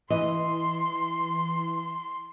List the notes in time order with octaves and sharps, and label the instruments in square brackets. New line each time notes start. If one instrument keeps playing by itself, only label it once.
[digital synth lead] E3 [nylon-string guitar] D#5 [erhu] C6